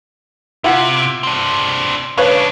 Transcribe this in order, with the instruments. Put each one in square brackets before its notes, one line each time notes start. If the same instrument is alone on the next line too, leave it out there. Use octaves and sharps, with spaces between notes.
[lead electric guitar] C3 [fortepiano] E4 F4 F#5
[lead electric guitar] C4 D4
[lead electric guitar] C#3 D4 [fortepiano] B4 C#5 F5